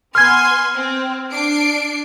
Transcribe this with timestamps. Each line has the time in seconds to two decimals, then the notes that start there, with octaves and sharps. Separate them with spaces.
0.15 B3 G#5 C6 F6 G#6
0.75 C4
1.32 D4 C7 D7